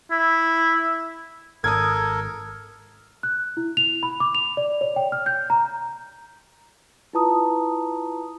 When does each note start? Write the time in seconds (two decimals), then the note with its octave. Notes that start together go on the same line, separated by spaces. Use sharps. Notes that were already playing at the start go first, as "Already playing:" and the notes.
0.11 E4
1.64 G#1 A4 A#4 D#6 G#6
3.23 F#6
3.57 E4
3.77 F7
4.03 B5
4.20 D6
4.35 F7
4.57 D5
4.81 C#5
4.96 G5
5.12 F6
5.26 G6
5.50 A#5
7.13 E4 F4 B4 A5 A#5 D#6